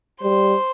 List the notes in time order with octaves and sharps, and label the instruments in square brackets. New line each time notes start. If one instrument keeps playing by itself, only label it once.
[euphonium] G3 [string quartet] C5